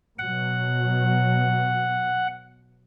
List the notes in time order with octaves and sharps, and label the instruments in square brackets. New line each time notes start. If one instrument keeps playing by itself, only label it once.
[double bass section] B2 F#3 [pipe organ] F#5